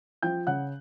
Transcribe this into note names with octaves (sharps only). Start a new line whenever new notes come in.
F3 G5 G6
C#3 F#5 F#6